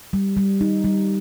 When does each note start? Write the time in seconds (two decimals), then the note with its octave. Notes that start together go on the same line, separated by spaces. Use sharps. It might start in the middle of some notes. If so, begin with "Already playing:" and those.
0.13 G3
0.37 G3
0.61 D#4
0.84 G3